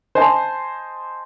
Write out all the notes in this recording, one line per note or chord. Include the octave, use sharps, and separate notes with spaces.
C5 D#5 G#5 A5